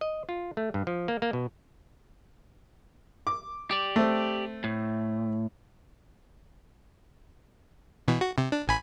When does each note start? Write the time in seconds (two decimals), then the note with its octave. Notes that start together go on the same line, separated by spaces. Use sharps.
0.01 D#5
0.29 F4
0.57 A3
0.74 G2
0.87 F3
1.08 A#3
1.22 A#3
1.33 B2
3.27 D6
3.71 G4 D5
3.96 A3 C4
4.64 A2
8.08 B2 E3
8.21 F#4
8.38 C3
8.52 D4
8.68 A1 G#5 B5